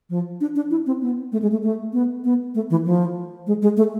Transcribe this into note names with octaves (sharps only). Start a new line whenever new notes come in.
F3
D4
D4
E4
C4
B3
A3
G#3
A3
A3
B3
B3
A3
E3
F3
G#3
G#3
A3